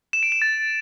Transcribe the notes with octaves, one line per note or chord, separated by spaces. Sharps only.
E7
D7
E7
A6